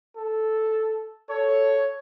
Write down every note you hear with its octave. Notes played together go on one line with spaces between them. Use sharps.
A4
A4 C#5